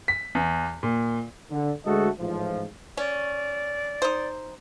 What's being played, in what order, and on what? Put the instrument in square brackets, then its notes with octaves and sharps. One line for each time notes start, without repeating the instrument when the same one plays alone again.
[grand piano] B6
E2
A#2
[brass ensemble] D3
D2 G#3 A3 F#4 A4 D#5
A1 G#2 F3
[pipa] C#4 [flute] D5
[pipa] D#4 C5